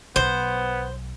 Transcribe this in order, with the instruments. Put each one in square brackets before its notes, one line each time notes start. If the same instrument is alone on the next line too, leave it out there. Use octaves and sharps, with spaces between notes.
[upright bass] B1 [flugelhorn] B3 [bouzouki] C5